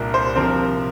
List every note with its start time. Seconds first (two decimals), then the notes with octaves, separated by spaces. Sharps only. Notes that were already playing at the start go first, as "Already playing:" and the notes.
Already playing: C2 A#2 D4 A#4
0.14 C5
0.36 C3 F3 C4 A#4